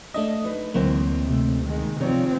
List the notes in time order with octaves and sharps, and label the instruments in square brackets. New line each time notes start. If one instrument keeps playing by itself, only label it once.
[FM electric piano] A3 D4 D#5 [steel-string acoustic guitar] E5
[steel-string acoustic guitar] D#4 B4
[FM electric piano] D2 E3 A#3 [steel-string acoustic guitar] F#3 G#3 C4
[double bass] C3 A3
D#3 G#3
[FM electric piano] C3 [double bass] F3 C4 [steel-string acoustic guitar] D#4 C#5 D5